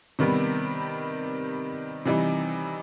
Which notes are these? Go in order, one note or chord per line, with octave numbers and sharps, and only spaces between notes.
C3 D#3 G3 B3
C3 E3 G3 D#4